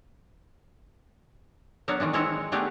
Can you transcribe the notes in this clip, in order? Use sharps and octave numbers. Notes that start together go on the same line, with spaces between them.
F#3 B3 D4 F#4 A#4
D#3 E3 G#3 D4
G#3 C4 E4 A#4 C#5 D#5
A3 B3 D4 G4 G#4 A#4